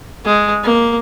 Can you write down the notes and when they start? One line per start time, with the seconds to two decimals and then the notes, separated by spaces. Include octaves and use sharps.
0.25 G#3
0.63 A#3